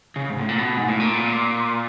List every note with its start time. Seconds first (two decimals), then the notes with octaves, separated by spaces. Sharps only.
0.16 C#3
0.30 G#2
0.39 A2
0.49 A#2
0.59 B2
0.77 G#2
0.88 A2
1.00 A#2